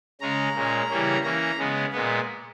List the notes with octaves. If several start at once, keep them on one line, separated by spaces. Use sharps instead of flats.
C#3 G#3 C#4 A#5
A#2 G#3 C#4
C#3 E3 G3 A#3 C#4
E3 A#3 C#4 A#5
C#3 G#3 B3
A#2 G#3 B3